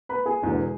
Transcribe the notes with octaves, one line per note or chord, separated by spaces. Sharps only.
B4 B5
G#4 G#5
E1 E2 D3